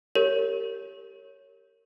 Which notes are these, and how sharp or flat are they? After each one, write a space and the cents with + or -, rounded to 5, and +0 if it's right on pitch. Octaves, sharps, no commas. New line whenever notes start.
G4 +0 A#4 -30 C#5 +0